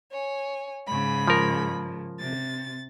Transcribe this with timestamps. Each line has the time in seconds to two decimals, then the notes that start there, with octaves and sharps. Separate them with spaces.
0.12 C#5 G#5
0.87 G#2 C#3 B5
1.28 F3 A#4
2.20 C3 A6